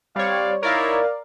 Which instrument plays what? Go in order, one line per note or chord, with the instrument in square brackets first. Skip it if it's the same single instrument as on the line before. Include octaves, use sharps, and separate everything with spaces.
[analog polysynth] G3 C#5 [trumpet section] C4 D5 F5
[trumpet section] D#4 E4 C#5 [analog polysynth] A#4 D5 F5